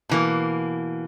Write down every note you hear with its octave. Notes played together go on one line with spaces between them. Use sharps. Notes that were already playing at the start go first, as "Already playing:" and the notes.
B2 E3 A#3